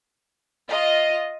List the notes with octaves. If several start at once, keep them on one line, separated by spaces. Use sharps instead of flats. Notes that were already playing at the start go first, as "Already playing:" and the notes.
F4 D#5